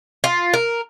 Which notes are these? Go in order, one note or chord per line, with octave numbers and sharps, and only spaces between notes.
F4
A#4